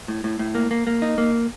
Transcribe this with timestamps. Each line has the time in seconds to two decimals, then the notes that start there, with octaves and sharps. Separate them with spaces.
0.08 A2
0.24 A2
0.39 A2
0.55 A#3
0.71 A#3
0.87 A#3
1.02 D#4
1.18 A#3